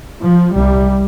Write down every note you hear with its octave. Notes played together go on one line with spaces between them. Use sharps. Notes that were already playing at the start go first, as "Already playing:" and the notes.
F3
C2 C3 G3